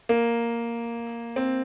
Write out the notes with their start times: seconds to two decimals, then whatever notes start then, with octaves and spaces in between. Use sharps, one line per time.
0.09 A#3
1.36 C4